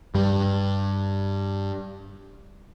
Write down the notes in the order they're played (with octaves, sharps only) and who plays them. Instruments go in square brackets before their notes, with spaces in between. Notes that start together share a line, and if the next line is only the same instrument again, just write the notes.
[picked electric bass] G2 G3